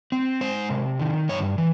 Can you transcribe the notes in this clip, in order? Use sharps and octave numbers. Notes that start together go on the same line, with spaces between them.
C4
G#3 C5
C3
D#3
G2 C#5
E3